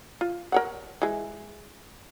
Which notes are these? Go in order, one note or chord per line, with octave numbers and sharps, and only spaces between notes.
F4
A#4 C#5 F#5
E3 G#3